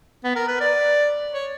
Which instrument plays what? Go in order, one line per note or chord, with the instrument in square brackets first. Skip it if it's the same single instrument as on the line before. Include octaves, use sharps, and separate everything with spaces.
[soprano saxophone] B3
A#4
B4
D5
C#5